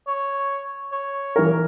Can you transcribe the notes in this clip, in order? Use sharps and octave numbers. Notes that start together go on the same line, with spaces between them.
C#5
C#5
E3 A#4